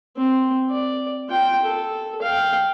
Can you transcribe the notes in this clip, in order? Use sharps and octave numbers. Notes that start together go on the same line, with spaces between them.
C4
D5
F4 G5
A4
F5 G5